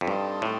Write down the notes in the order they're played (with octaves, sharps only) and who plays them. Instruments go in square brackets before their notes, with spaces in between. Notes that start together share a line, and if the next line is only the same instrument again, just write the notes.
[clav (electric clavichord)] F2
[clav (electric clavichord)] G2 [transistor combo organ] G3 C4 D#4 A4
[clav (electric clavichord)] A2